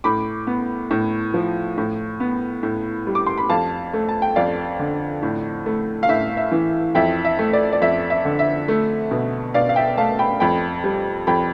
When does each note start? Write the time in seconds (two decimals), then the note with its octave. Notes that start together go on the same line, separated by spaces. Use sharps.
0.04 A2 B5 D6
0.47 B3
0.91 A2
1.34 F3
1.78 A2
2.20 B3
2.63 A2
3.07 G3
3.15 D6
3.27 C6
3.38 B5
3.49 F2 F5 A5
3.93 A3
4.09 A5
4.22 G5
4.36 F2 D5 F5
4.79 D3
5.23 A2
5.66 A3
6.03 F5
6.09 A2 E5
6.37 E5
6.51 E3
6.95 F2 E5 G5
7.25 E5
7.39 A3
7.53 D5
7.73 D5
7.82 F2 E5
8.10 E5
8.25 D3
8.39 E5
8.68 A3
9.11 B2
9.54 B2 D5 F5
9.69 F5
9.76 E5 G5
9.97 A3 F5 A5
10.19 G5 B5
10.40 F2 G5 B5
10.84 G3
11.27 F2 G5 B5